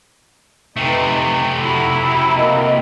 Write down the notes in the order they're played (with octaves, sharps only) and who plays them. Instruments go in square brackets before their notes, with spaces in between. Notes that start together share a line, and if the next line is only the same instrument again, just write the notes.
[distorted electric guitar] C3 A3 [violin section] D#4 B4
[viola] E4 [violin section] F#4 A#5
[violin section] A#3 C4 F#4 [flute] D#5